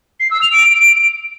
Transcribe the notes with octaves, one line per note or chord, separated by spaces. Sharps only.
C7
E6
F7
D7